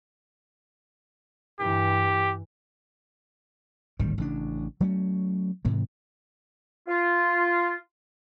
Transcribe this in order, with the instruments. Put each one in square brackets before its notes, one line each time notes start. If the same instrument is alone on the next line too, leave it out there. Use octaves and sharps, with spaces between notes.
[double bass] G2 E3 [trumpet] G4
[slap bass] D1 G#1 D#3 G3
A1 C#3 D4
F#3 A3 C#4
G#2 C3 E3
[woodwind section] F4